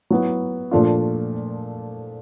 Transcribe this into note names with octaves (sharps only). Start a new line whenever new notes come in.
F#3 B3 E4
A#2 F3 A3 D4 F4